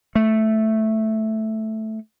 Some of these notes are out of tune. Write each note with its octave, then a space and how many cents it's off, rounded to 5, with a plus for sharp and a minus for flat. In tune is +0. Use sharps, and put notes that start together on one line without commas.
A3 -5